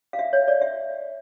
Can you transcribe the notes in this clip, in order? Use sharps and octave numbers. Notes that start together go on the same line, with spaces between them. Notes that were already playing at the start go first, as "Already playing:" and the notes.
F5
E5
C#5
D5
E5